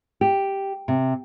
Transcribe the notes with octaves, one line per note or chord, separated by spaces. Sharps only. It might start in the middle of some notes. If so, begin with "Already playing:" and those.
G4
C3